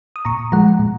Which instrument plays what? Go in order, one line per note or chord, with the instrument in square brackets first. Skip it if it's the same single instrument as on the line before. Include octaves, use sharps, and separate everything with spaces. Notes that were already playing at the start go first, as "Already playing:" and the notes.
[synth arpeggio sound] D#6
A#2 A#5 C#6
F3 G#3 F#5 A#5
A#2